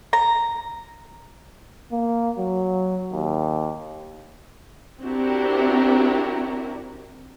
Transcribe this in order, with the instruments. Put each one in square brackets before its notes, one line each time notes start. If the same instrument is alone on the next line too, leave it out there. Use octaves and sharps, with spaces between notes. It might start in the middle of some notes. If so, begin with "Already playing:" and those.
[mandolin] A#5
[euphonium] A#3
F#3
D#2
[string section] C4 D4 E4 F#4 G4 A#4